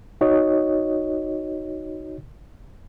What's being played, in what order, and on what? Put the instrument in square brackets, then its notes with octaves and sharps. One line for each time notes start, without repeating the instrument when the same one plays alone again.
[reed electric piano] D#4 F#4 C#5 D#5